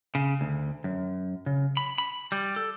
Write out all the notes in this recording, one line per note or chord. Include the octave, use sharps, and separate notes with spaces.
C#3
D2
F#2
C#3
B5
B5
G3
A4